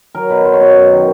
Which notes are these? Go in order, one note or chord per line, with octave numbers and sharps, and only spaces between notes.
F#3 A#4
B2 B4
F#3 C5
C#5
B2 C5
F#2
D#3